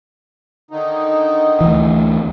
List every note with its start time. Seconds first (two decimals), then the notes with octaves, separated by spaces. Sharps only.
0.71 D3 D#3 D#4
1.61 D2 E3